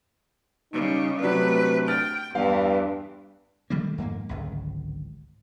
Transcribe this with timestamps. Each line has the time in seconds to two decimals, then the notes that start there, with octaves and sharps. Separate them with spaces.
0.73 C#3 G3 D#4
1.21 C3 F#3 A3 D4 B4
1.88 G5 F6 A6
2.35 E2 G2 E3 F5 G5
3.70 D#3 G3 A3 A#3
3.98 F2 G#2 A#3
4.29 D1 G#1 C#2